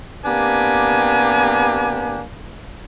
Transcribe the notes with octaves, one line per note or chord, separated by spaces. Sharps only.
C3 A#3 B3 D4 G4 G#5